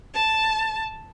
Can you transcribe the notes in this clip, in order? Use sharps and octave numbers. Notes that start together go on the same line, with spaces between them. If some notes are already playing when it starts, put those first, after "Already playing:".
A5